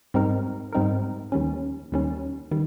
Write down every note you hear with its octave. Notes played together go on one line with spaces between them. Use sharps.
G#2 G3 C4 D#4 A#4
G#2 G3 C4 D#4 A#4
D#2 D#3 G3 C#4
D#2 D#3 G3 C#4
D#3 G3